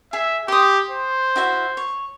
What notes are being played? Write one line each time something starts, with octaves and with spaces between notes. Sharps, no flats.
G#4 E5
G4 C6 D#6
C5
E4 F#4 E5
C#5